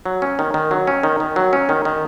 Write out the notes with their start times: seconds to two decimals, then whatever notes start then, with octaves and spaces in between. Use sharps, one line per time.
0.06 F#3
0.22 C#4
0.39 D#3
0.54 D#3
0.71 F#3
0.87 C#4
1.03 D#3
1.20 D#3
1.36 F#3
1.53 C#4
1.69 D#3
1.85 D#3